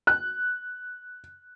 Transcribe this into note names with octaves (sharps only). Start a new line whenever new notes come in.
F#6